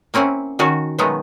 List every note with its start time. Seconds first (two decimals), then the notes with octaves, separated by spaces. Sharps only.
0.14 A#3 C4 C#4 E4 F#5
0.59 D#3 C#4 F#4 A5
0.99 B2 D#3 F#3 G#3 A3 B3